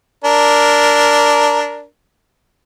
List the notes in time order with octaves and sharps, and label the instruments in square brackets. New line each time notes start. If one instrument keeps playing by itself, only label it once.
[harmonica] D4 A#4